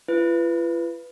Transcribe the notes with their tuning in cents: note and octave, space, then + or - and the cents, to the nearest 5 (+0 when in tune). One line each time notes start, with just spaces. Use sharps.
F4 -45 B4 +5